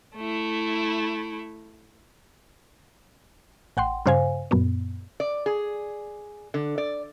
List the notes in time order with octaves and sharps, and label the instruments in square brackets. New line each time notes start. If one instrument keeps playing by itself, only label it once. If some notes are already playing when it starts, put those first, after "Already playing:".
[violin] A3 E4
[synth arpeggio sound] A1 F#5 G5 C6
G2 C#3 C5 F5 G#5
F#2 A#2 B3
[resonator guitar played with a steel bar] D5
G#4
D3
D5